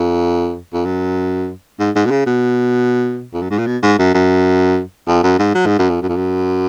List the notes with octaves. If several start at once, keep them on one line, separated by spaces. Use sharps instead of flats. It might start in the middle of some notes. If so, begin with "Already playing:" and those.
Already playing: F2
F2
F#2
G#2
G#2
B2
C#3
B2
F2
F#2
G#2
A#2
B2
G#2
F#2
F#2
F2
F#2
G#2
F#3
G#2
F#2
F2
F#2
F2
F#2